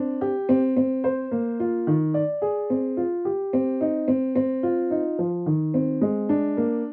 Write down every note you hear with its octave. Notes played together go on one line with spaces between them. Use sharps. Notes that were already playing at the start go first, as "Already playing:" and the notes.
Already playing: C4 D4
G4
C4
C4
C5
A#3
F4
D#3
D5
G#4
C4
F4
G4
C4
D#4
C4
C4
F4
D#4
F3
D#3
C4
G#3
D4
A#3